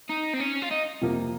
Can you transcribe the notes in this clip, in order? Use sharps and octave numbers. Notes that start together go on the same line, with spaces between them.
D#4
C4
C#4
F4
D#4
F2 C3 F3 A#3